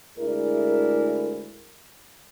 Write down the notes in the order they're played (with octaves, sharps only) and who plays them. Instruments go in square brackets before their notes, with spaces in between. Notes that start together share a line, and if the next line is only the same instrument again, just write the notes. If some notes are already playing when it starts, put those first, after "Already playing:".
[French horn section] D2 G#3 E4 G#4 A#4 D5